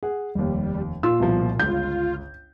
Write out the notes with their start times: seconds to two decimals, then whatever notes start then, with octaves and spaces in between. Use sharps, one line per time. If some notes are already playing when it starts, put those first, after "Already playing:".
0.03 G#4 F#5
0.35 F1 D#2 G3
1.03 A#2 F4 E6
1.20 C2 B2 F3
1.59 G1 C#2 F4 G6